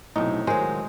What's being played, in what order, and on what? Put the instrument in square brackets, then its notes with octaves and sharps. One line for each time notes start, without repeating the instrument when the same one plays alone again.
[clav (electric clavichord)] B1 D#4 [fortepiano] A2 [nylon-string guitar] C3
[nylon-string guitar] D#3 F#3 [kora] G#3 [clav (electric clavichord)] C5